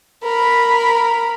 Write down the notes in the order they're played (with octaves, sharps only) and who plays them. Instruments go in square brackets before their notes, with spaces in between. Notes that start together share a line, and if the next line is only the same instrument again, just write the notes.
[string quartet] A#4 B5